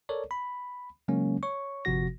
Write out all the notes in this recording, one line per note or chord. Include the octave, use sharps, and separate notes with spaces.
A4 A#4 C#5 D5
B5
C#3 F#3 G#3 A#3 C#4
C#5 C#6
G1 C3 F3 F#4 A#6